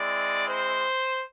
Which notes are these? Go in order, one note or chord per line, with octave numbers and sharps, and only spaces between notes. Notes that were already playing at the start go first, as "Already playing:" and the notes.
Already playing: G#3 C4 E4 D5
C5